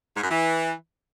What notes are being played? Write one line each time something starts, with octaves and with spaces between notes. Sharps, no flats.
G#2
F#2
E3